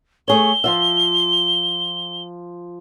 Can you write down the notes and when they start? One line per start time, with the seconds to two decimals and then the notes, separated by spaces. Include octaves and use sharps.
0.28 A3 G#4 C#5 G7
0.64 F3 F4 E5